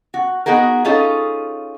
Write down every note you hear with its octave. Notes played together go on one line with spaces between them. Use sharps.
F#4
B3 D#4 F#4 G#4 A#4
C#4 D#4 F4 G#4 A4